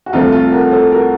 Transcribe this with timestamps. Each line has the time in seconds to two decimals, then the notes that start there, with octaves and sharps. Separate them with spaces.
0.06 F#4
0.13 C2 C3 F3 A3 C4 F4 A4
0.32 F4 A4
0.52 F#4 A#4
0.72 A4 C5
0.92 F#4 A#4